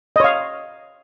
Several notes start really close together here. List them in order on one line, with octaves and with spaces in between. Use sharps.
D#5 C#5 F5